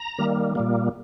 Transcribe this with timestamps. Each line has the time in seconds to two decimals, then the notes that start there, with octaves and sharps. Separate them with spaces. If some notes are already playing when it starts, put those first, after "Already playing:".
Already playing: A#5
0.18 D#3 G3 A#3
0.55 A#2 G3 A#3